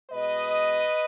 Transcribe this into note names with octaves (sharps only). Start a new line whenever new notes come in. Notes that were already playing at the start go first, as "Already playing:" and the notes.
B2 G#3 B4 D#5